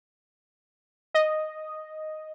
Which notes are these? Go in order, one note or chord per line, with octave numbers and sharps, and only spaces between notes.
D#5